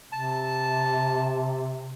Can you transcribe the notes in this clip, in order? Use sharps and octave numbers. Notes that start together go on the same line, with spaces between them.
C3 A5